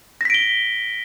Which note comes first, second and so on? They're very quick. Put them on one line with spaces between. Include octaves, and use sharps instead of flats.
A#6 B6 D7 G7